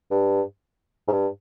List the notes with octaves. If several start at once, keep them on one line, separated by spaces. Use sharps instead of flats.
G2
G#2
G2